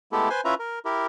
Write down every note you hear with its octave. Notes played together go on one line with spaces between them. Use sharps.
G#3 A3 B3 E4 G4 A4
B4 C5 G#5 C6
C#4 E4 F4 B4 E5 A#5
A#4
E4 G4 A#4